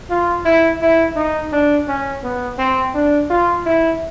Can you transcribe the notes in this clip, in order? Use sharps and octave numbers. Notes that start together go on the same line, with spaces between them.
F4
E4
E4
D#4
D4
C#4
B3
C4
D4
F4
E4